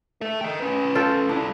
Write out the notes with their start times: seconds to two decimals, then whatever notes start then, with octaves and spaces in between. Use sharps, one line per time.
0.21 A4 E5
0.41 D#5 G5
0.60 C#4 B4
0.95 F4 A4 G5
1.29 G3 D4 E4